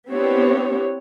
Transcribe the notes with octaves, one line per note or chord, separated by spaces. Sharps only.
B3 C4 D4 E4 G4 C#5